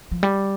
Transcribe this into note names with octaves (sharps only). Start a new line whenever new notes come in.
F3
G3